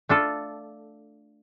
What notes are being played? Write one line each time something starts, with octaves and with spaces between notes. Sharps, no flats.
A3 D4 F4 A4